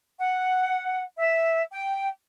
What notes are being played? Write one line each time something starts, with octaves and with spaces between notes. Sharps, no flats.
F#5
E5
G5